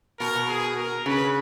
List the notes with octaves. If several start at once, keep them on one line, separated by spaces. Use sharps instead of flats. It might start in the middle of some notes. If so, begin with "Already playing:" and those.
B2 A#4
B2
G#4
A#4
C#3 B4